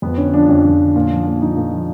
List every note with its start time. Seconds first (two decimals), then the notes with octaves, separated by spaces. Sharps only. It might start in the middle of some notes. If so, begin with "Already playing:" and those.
0.02 F2 B3
0.17 D3 C#4
0.34 F3 D4
0.49 F2 C#4
0.65 F2
0.80 D3
0.96 A#2
1.11 F3
1.26 A#2
1.41 F3 D#4
1.57 A#2
1.73 F3